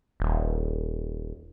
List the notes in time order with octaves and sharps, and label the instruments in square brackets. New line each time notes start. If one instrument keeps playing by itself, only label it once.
[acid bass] D#1